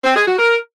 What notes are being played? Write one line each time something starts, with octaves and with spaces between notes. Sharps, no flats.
C4
G#4
F#4
A#4